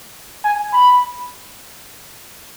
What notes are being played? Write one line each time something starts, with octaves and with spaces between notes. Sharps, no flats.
G#5
B5